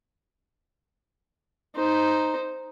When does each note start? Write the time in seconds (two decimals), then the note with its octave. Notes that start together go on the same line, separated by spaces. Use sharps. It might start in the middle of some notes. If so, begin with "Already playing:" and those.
1.76 D#4 C5